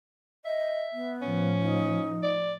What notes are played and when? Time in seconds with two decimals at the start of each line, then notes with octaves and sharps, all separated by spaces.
0.45 D#5 E5
0.93 B3
1.22 A2 F3 C#4
1.61 D#4
2.23 D5